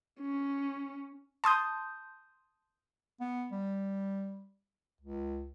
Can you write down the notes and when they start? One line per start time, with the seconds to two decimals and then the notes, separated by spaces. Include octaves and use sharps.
0.21 C#4
1.44 A5 C6 D#6 G6
3.21 B3
3.52 G3
5.01 C#2